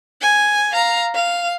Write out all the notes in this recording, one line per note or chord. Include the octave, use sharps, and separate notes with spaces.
G#5
F5 A#5
F5